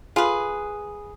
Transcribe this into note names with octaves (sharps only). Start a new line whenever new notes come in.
F4 G#4 B4